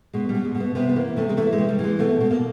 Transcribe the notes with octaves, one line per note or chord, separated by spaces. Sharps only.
B2 G#3
G3
B2
G#3
B2
B3
C3 B3
B3
E3 A#3
C3 A3
G#3
E3 A3
G#3
C3
G3
E3
G#3
B2 A3
B2
A#3